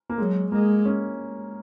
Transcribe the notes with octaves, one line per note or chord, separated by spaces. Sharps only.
A#3
F#3 G#3
G#3 A#3
C#4